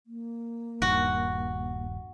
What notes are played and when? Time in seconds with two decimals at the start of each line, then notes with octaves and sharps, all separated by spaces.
0.07 A#3
0.82 D#1 G2 F#4